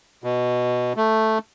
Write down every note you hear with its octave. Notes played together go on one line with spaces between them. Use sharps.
B2
A3